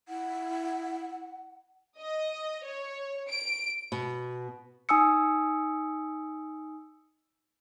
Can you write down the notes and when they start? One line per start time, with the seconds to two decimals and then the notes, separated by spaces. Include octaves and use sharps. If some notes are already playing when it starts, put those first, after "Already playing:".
0.08 E4 F#5
1.99 D#5
2.65 C#5
3.30 D7
3.92 B2
4.89 D#4 G#5 D#6 E6 C#7